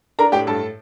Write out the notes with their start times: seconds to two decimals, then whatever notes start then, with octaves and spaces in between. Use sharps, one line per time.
0.19 D4 A#4 A#5
0.32 A2 G4 G5
0.47 G2 A4 A5